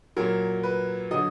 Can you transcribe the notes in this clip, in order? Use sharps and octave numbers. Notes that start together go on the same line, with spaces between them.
A#2 F#3 A#4
B4
D3 F#3 D#5